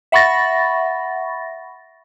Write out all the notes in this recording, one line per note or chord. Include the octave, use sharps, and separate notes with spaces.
E5 F#5 B5 C#6 A6 A#6